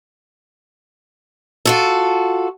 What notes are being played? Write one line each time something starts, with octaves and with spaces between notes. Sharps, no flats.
F4 F#4 A4